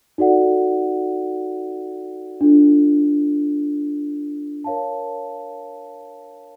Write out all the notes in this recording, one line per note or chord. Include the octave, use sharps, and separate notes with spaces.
D#4 F#4 A4 D5 F#5
D4 F4 A4
A#4 C#5 F5 A5